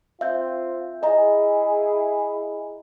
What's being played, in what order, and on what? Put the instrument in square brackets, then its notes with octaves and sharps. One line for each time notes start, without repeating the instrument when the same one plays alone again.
[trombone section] C4 F4 [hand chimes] E5 G6
[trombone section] E4 G#4 [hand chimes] D#5 A#5